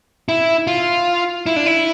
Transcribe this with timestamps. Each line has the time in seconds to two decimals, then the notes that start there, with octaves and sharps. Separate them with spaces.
0.29 E4
0.67 F4
1.46 E4
1.56 D4
1.66 E4